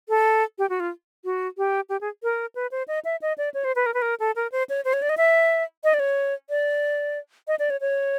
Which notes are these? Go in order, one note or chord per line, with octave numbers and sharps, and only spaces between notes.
A4
G4
F#4
F4
F#4
G4
G4
G#4
A#4
B4
C5
D#5
E5
D#5
D5
C#5
C5
B4
A#4
B4
A#4
A4
A#4
C5
C#5
C5
C#5
D5
D#5
E5
D#5
D5
C#5
D5
D#5
D5
C#5
C#5